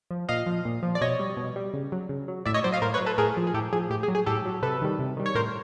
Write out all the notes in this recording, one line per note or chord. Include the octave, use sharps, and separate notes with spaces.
F3
A#2 D#5 F5
F3
A#2
F3
D5
B2 C#5 D#5
G3
B2
G3
C#3
F#3
C#3
F#3
A2 D5 E5
C#5 D#5
F#3 C5 D5
D#5 F5
A2 A#4 C5
B4 C#5
F#3
A4 B4
A2 G#4 A#4
F3
G#4
A2 G4 A4
F3 G#4
A2 G4
G#4
F#3
G#4
A2 G4 A4
F#3
C3 A4 B4
D#3 G3
C3
D#3 G3
C#5
A2 A#4 C5